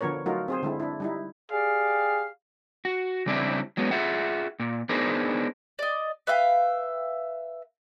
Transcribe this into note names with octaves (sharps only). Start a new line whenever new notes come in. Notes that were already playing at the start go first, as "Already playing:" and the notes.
D3 F3 B3 A#4 C#5
F#3 A3 D#4 F4 F#4 A#4
C4 G#4 C5
D3 G#3 E4
D4 E4
G3 D#4 E4
G4 G#4 D5 F5
F#4
C#3 G3 C4 D4 E4
F#3 G#3 B3
F4 G#4 E5 F#5
A#2
B3 D4 D#4 G#4 A#4 C5
D5 D#5
B4 E5 F5 G5